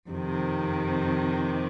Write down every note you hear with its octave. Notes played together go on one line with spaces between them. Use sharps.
F2 C3 D#3